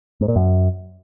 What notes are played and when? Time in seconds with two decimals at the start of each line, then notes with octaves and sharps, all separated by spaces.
0.21 G#2
0.28 A#2
0.36 F#2